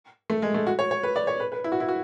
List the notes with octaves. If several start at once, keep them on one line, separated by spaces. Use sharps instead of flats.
A3
G#3
A3
F#4
C#5
C#5
B4
D5
C#5
B4
B4
E4
F#4
E4
F#4